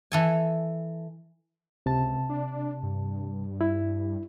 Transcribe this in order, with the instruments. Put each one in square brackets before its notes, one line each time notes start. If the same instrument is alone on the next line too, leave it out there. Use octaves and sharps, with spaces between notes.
[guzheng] E3 A4 G#5
[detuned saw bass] C#2 [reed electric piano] C3 A5
[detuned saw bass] D4
G2
[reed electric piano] E4